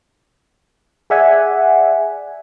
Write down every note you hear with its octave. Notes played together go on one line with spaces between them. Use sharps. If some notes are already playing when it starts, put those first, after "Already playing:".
G#4 D5 E5 F#5 G#5